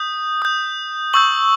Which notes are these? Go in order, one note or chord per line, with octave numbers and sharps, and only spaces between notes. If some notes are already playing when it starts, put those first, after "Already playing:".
Already playing: D#6 G6
D#6 G6
C#6 E6 G6 F#7